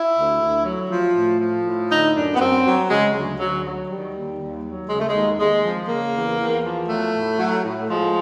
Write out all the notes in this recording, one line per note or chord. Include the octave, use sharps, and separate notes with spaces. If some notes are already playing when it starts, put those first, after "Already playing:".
Already playing: E4
D2
D2
F#3
F3
A2
F3
A2
D3 D#4
F#2 D4
B3
F#2 C4
F#3
C#3 G#3
D2 F#3
D2 F#3
F#3
D#3 G3
D#2
D#2
F#3
C#3 G#3
A3
D#2 G#3
D#2 G#3
F3
C#3 A#3
E2
E2
F3
F#3 A3
A2
F#3
A2
F3 G#3